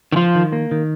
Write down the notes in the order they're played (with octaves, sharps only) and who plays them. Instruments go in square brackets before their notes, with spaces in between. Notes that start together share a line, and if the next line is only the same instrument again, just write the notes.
[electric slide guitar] D#3
[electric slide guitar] F3 [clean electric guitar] F4
[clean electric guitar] D#3
A#3
D#3